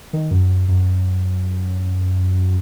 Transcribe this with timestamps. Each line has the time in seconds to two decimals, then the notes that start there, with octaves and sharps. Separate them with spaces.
0.13 D#3
0.31 F#2
0.68 F#2